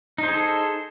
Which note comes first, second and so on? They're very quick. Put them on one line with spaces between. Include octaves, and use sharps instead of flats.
D#4 C5 G#4 A4